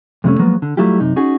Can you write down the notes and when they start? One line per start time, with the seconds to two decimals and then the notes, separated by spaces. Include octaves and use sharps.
0.24 F2 C3 G3 A3 C#4
0.40 F3 F#3 G#3 A#3 B3
0.62 D3
0.77 F#3 G3 A3 E4 F4 G4
1.00 F#2 C3 D#4
1.16 C#4 D#4 F#4 G#4